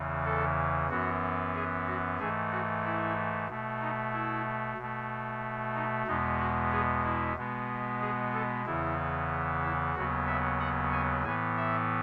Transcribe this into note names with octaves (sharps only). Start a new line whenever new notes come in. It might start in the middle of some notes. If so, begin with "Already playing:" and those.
Already playing: E2 C#3 E3
A4
F#2 E3 B3 F#4
G#4
F#4
G#2 E3 A3 G#4
F#4
E4
B2 A3
D#4
E4
B2 A3
D#4
E2 B2 G#3 B3 D#4
F#4
G#4
E4
B2 G#3 B3
G#4
A4
E2 C#3 E3 B3 E4
E4
D#2 C#3 F#3 B3 F#4
E5
F#5
G#5
A2 E3 B3 G#5
E5